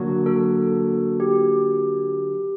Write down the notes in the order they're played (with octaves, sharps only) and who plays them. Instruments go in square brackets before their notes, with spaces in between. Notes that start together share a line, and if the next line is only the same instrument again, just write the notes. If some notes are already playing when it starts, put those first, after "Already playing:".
Already playing: [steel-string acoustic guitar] D3 F#3 A#3 F#4
[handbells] A4
G4